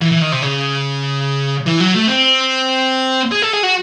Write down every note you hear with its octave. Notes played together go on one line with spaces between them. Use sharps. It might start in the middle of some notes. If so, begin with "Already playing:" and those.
E3
E3
D#3
C3
C#3
E3
F#3
A3
C4
G#4
A4
G#4
F#4